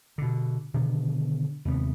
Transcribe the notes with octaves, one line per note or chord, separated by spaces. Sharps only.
B2 D3
B2 D3 D#3
D#2 C3 A3 B3